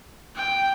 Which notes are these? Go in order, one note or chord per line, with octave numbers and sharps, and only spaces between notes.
G5